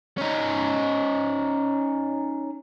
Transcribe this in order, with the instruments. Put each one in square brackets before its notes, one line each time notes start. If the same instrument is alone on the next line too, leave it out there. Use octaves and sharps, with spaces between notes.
[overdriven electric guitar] C#4 D#4